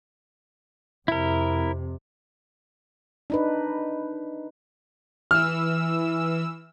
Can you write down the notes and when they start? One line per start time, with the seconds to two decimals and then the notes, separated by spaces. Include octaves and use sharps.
1.08 F2 C3 E4 A#4
3.30 D4 D#4 B4
5.31 E3 E6 F6